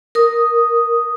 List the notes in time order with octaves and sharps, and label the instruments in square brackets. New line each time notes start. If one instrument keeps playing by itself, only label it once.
[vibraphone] A#4 D#6